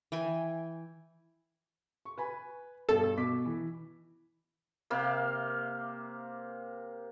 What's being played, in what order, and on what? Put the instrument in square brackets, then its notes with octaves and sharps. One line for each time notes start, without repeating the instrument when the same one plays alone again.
[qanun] E3 G5 G#5
[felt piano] C#6
B4 G#5 B5
[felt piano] G2 B2 G3 [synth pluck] A4
[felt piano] B2 D6 B6
E3
[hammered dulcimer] C3 A#3 F5